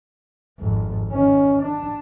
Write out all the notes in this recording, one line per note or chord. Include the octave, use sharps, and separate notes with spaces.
G#1 F2
D#3 C#4
D4